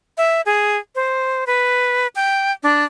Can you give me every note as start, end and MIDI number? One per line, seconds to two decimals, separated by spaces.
0.18 0.41 76
0.46 0.77 68
0.95 1.45 72
1.47 2.07 71
2.16 2.52 79
2.63 2.84 62